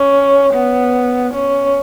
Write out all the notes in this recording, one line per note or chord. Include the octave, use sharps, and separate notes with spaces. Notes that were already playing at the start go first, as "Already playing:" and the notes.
Already playing: C#4
B3
C#4